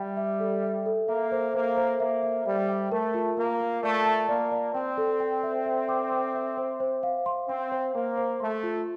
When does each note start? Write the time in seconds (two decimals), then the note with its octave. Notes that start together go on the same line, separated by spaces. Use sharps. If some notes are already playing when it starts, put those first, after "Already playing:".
Already playing: G3 E5 G5
0.17 E5
0.40 A4
0.63 E5
0.86 A4
1.08 A#3 E5
1.32 C5
1.54 A#3 C5
1.77 C5
2.00 A#3 E5
2.23 E5
2.46 G3 E5
2.69 G5
2.91 A3 A#4
3.14 F4
3.37 A#3 A#4
3.60 A#4
3.83 A3 D5
4.06 A5
4.29 A#3 D5
4.52 D5
4.74 C4 G5
4.98 A4
5.20 G5
5.43 E5
5.66 E5
5.89 D6
6.12 D6
6.35 E5
6.57 C5
6.80 C5
7.03 F5
7.26 C6
7.48 C4 C6
7.72 C5
7.94 A#3 C5
8.17 C5
8.40 A3 C6
8.63 F4